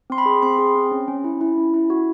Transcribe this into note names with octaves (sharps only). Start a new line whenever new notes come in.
C4 C6
B5
G#4
C4 C6
G#4
C4
C#4
C#4
E4
E4
C#4
E4
F#4